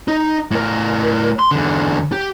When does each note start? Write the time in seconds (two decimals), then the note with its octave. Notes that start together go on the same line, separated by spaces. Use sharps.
0.08 D#4
0.51 A2 A#4
1.39 C6
1.51 E2 D3
2.12 G4